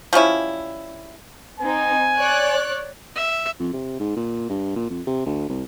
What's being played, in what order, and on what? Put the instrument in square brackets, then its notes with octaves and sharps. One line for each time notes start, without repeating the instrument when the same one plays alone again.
[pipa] F3 G3 C#4 E4
[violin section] C4 D#4 [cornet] G#5
[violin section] C#5 D5 F#6
[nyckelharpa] E5
[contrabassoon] F2
C3
G#2
A#2
G2
A#2
F2
C3
D2
C2